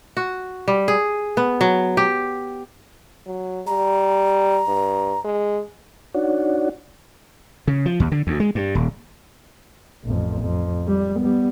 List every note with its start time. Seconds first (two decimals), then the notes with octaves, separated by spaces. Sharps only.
0.17 F#4
0.68 G3
0.88 G#4
1.37 B3
1.61 F#3
1.97 G4
3.26 F#3
3.67 G3 A#5
4.68 G2
5.24 G#3
6.14 D4 D#4 F#4 C#5 D5 F#5
7.68 C#3
7.86 F3
8.00 D#2
8.12 D3
8.27 D2
8.40 G#3
8.55 G2
8.75 D#1
10.04 A1 F2
10.42 F2
10.87 G3
11.20 G3 B3